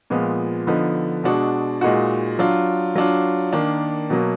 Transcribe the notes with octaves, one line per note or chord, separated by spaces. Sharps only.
A#2 F3 G#3 B3
D3 F3 B3 D#4
B2 G#3 D4 F#4
A#2 G#3 D#4 F#4
F#3 D4 F4
F#3 D4 F4
D#3 A#3 D4
B2 F#3 A#3